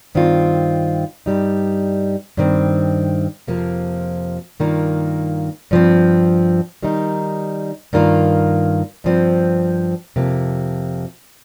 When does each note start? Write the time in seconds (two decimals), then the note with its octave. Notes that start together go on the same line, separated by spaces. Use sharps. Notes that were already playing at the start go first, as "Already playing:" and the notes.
0.15 G2 D#3 C4 F4
1.26 G2 G3 D#4
2.37 G2 D#3 C4
3.48 F2 C3 F3 A#3
4.60 G2 D#3 A#3 F4
5.71 G2 F3 C4
6.82 D#3 G3 D#4
7.93 G2 D#3 A#3 F4
9.04 G2 F3 C4
10.16 F2 C3 F3 A#3